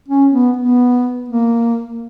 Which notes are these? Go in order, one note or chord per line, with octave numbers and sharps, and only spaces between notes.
C#4
B3
B3
A#3